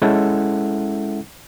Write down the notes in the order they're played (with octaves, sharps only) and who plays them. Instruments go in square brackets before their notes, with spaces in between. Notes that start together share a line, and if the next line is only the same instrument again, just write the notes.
[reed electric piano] G#3 C#4 E4 A4 E5 F#5